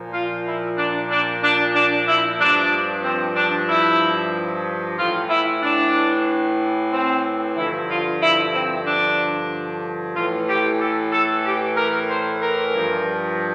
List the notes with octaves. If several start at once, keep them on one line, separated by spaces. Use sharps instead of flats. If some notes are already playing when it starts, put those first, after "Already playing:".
Already playing: A#2 F3
F4
E4
D4
D4
D4
D4
E4
G2 F3 D4
C4
D4
E4
A2 E3 F4
E4
D4
C4
G2 D3 F3 E4
F4
E4
C4
D4
A2 E3 F4
G4
A4
A4
G4
A#4
C5
A#4
G2 F3